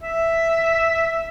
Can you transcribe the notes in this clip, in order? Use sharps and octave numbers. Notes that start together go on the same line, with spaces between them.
E5